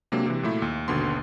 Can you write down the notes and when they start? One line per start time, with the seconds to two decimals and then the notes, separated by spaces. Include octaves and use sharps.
0.12 C3 F#3 G#3 A#3 D4
0.26 C3 E3
0.43 A#2 F#3 A3 E4
0.62 D#2
0.88 G#1 D#2 B2 D3 B3 C6